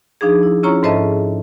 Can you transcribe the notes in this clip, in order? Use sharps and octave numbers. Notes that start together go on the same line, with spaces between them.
F3 D4 D#4 G#4
E4
C#4 E4 F4 C#5 A#5 C#6
G#2 A4 C5 D#5 E5 A5